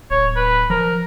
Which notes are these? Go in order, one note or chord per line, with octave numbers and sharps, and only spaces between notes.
D1 C#5
B4
F3 A#4